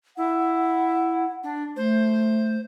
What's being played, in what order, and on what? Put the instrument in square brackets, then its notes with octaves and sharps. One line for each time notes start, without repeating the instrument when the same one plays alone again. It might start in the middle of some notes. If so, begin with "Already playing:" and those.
[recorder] E4 [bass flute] F#5
[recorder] D4
[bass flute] A3 [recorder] C5